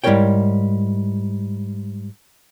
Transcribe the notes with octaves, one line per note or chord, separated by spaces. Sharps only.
G#2 G3 E4 A#4 C#5 G5